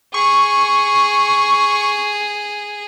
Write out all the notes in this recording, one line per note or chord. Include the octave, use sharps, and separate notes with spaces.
G#4 C#6